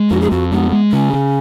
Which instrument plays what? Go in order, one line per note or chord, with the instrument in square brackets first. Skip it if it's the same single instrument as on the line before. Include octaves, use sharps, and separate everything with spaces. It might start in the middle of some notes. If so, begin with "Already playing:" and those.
Already playing: [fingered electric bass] G#3
[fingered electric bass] F2 [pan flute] F#4
[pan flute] G#4
[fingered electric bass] F2 [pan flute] F#4
[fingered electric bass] G#3 [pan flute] B3
[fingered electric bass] G#3
[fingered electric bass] C#3 [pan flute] C#4
[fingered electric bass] C#3